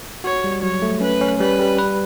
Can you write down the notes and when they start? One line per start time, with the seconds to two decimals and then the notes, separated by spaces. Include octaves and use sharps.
0.24 F#4 C#5
0.44 G3
0.63 F#3 C#5
0.82 A3
1.01 C#4 B4
1.21 C#4
1.40 G3 B4
1.59 G3
1.78 B4